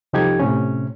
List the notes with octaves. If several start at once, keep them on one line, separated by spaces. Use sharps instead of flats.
C2 F3 D#4 G4 A4 G#6
A2 C3 C#4